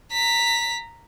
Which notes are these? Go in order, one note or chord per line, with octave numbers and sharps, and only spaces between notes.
A#5 B6